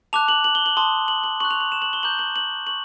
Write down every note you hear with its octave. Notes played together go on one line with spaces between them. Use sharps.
A5 D6 F#6 F7
F#7
F#7
G7
F#7
A5 C6 D#6 G7
F#7
F#7
C#6 F#6 F#7
F7
F#7
E7
F#7
G7
A#5 D6 G6 F#7
F#7
F#7
C#6 F#7